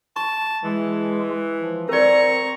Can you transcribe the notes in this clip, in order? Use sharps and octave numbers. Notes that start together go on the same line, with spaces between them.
A5 C#6
E3 G#3
F3
C4 A#4 D5 A#5 C#6